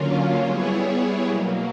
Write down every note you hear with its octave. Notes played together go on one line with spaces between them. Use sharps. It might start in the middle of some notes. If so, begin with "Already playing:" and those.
Already playing: D3 F#3 A#3 C#4 F4
G3 B3 E4 G#4 C#5
B2 F#3 A#3